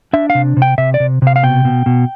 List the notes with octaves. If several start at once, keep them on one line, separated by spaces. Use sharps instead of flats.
D4 E5
F5
C3
C3
G5
C3 E5
D5
C3
C3 F5
F5
B2 G5
B2
B2